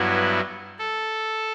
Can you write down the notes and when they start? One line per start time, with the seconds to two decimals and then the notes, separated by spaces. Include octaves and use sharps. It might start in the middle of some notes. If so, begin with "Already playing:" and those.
Already playing: G2 F#3 B3 E4
0.79 A4